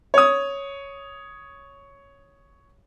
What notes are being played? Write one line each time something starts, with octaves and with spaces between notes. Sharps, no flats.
C#5 D#6